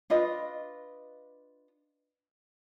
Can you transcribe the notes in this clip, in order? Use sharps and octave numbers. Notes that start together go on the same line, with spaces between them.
D4 F4 B4 D#5